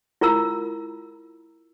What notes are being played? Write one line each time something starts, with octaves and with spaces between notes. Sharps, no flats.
E4 F4 A#4 A#5 E6